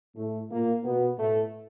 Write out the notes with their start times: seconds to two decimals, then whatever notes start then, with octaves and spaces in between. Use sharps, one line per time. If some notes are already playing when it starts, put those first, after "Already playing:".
0.16 A2 A3
0.50 A#2 A#3
0.84 B2 B3
1.17 A2 A3